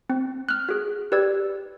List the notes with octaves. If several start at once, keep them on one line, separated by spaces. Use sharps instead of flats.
C4
F6 F#6
F#4 G#4
G4 B4 D5 E6 G#6